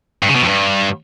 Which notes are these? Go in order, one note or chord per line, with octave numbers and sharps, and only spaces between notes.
G2
C#3
B2
F2
G2